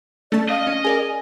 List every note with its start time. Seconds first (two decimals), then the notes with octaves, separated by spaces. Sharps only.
0.32 A3 C#4 D5 A5
0.49 D#5 F5
0.67 C#4
0.85 G#4 A#4 D5 G#5